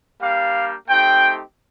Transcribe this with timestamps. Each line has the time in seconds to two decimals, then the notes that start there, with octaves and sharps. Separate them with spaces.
0.21 G3 A#3 D4 G4 F5
0.87 A3 C4 D#4 G4 G5